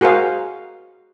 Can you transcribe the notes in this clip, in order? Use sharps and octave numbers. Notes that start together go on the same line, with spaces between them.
F#4 G#4 A#4 C5 F5